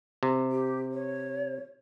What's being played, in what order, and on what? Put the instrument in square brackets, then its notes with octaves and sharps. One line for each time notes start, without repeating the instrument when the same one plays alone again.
[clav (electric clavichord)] C3
[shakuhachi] G4
C#5